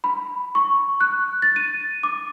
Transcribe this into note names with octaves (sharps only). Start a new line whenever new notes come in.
B5
C#6
F#6
A6
D#7
D6